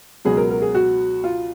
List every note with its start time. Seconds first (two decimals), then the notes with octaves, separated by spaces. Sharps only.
0.25 C#2 B2 F#3 G#4
0.37 A#4
0.50 A#4
0.62 G#4
0.75 F#4
1.24 F4